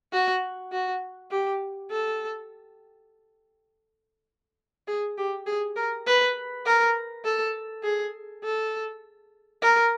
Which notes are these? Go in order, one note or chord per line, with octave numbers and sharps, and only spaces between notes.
F#4
F#4
G4
A4
G#4
G4
G#4
A#4
B4
A#4
A4
G#4
A4
A#4